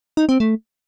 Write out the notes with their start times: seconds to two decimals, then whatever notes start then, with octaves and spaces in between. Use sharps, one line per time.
0.17 D#4
0.29 C4
0.40 A3